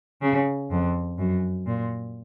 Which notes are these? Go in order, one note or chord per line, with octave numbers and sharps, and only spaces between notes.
C#3
F2
F#2
A#2